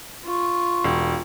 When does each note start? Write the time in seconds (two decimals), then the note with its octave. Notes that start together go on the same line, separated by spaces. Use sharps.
0.24 F4 C#6
0.84 E1